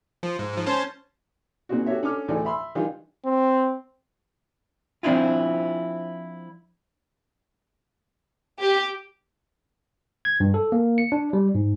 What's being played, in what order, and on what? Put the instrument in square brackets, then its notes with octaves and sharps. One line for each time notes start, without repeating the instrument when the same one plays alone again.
[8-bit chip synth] F3
G#2
G#2 F3
C#4 C5 A5
[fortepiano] A#2 C#3 C4 D#4 F#4
F#4 G4 A4 C#5 E5
C#4 D4 A4 D6 F6
D2 A2 C#3 E3 A4 D5
E5 B5 C6 E6
D#3 E3 G3 D4 D#4 F4
[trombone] C4
[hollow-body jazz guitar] F3 C4 D4 E4 F4
[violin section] G4
[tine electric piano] G#6
G2
A4
A#3
C#7
D4
G3
G#2